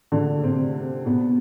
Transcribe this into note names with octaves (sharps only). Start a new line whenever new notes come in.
D3 D4
C3 C4
B2 B3